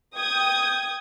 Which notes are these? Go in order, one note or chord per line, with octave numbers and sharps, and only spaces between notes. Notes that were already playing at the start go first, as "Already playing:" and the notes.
G5 D#6 G6 G#6